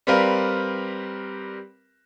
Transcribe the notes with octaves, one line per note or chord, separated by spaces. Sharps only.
G3 C4 G4 A#4 B4 F5